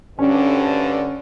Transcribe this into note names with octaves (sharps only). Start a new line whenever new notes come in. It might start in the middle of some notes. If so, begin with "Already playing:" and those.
D2 G2 D3 C#4